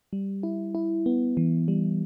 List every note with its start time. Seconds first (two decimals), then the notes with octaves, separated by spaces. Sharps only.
0.13 G3
0.43 E4
0.75 E4
1.06 B3
1.37 E3
1.68 G3